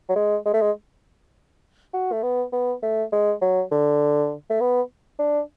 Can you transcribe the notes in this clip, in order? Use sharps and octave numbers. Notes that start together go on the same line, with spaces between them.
F#3
G#3
G#3
A3
G#3
F#4
A3
B3
B3
A3
G#3
F#3
D3
A3
B3
D4